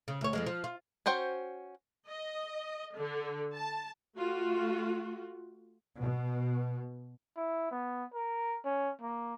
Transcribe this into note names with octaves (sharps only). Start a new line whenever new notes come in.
C#3
D2 C#5
F2 F3 G#3
F3
F4
C#4 F#4 C5 G5
D#5
D3
A5
A3 F4 F#4
B2
E4
B3
A#4
C#4
A#3